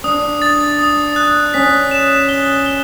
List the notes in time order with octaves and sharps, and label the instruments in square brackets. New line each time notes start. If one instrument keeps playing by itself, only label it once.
[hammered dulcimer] D4 [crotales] D#6
[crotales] A6
D#6
F#6
[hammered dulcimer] C#4 [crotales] B6
[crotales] E7
G7
G7